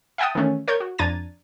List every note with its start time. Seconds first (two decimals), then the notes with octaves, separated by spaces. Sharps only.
0.18 E5 F#5 G5 A5 D#6
0.35 D#3 E3 A3 C#4
0.68 A#4 C#5 C#6 G6 G#6
0.80 F#4
0.98 F2 D4 A#5 G#6 A6 D#7